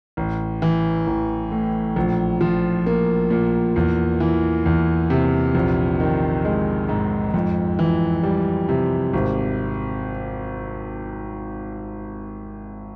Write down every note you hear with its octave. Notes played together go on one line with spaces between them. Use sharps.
A1
E3
A1
A2
A#1
F3
A#3
A#2
E2
E3
E2
C3
A#1
D#3
G#3
G#2
F2
E3
G3
C3
G#1